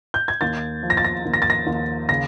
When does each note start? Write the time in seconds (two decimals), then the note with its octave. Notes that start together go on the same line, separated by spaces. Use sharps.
0.14 G6
0.28 G#6
0.41 D#2 A6
0.83 F3
0.90 A#6
0.97 A6
1.04 A#6
1.26 D#2
1.34 A#6
1.42 A6
1.50 A#6
1.67 D#2
2.09 C#3 A#6